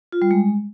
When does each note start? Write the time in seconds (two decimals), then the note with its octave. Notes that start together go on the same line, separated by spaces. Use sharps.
0.12 F4
0.22 G3
0.31 G#3